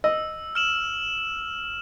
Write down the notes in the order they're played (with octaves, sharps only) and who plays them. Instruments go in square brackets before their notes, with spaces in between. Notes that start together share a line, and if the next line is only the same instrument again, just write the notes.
[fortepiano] D#5 [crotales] E6
[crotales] F6 E7 F#7